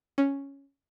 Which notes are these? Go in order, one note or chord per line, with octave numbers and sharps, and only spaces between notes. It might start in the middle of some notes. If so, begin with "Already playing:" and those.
C#4